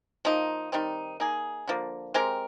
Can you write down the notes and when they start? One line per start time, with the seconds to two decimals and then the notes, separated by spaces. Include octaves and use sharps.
0.25 F3 A#3 D#4
0.72 D#3 G3 C4 D#4
1.20 A#3 D#4 G#4
1.67 D3 F3 A#3
2.14 G#3 C4 G4 A#4